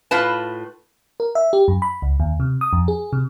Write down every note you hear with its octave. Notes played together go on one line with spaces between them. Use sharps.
A2 F4 B4 A5
A#4
E5
G4
F#2
B5
C#2
D#2
C3
D#6
F2
G#4
C3